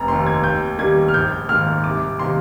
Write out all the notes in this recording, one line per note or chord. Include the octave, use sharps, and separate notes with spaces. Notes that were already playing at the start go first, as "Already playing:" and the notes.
Already playing: F1 A#5
D#2 D#3 C6
G#6
D#2 G6
D#3 G3 A#3 G#6
F6
A#1 G6
G#2 D#3 A#3 F6
C2 D6
C3 D#3 A#3 C6